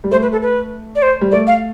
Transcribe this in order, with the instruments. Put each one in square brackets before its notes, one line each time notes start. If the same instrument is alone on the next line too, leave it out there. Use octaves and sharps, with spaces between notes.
[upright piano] G3
[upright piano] A3 [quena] C5
[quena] B4
A4
B4
D5
C5
[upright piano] G3
[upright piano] A3 [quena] D5
[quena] F5